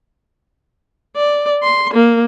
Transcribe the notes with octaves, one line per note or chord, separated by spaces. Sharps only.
D5
C6
A#3